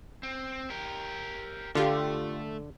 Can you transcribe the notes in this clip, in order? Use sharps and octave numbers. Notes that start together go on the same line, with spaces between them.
C4
G4 A#4
D3 A3 F4 G4